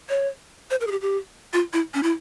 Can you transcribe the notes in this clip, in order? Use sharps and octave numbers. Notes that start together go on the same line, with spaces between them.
C#5
C5
A#4
G#4
G4
G4
F4
E4
C#4
E4